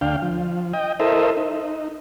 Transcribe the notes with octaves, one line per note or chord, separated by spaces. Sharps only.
D2 D4 F5 G5
F3
D#5 G5
E4 A4 A#4 C5 D#5 E5
D#4